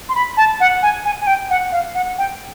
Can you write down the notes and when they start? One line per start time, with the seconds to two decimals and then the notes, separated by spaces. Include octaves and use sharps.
0.09 C6
0.15 B5
0.37 A5
0.60 F#5
0.83 G#5
1.05 G#5
1.21 G#5
1.27 G5
1.50 F#5
1.72 F5
1.95 F#5
2.18 G5